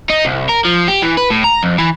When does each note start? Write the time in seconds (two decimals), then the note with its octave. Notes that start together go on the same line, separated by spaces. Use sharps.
0.10 D#4
0.25 C2
0.49 A#4
0.65 F3
0.88 G4
1.03 E3
1.18 B4
1.30 A2
1.44 A#5
1.63 F2
1.78 E3